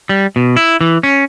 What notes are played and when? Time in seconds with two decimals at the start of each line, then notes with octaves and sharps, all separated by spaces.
0.09 G3
0.36 B2
0.57 E4
0.81 E3
1.03 C#4